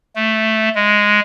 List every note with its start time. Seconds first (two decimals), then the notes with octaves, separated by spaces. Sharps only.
0.16 A3
0.75 G#3